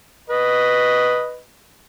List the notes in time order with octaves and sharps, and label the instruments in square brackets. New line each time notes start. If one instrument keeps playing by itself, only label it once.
[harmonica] B4 D#5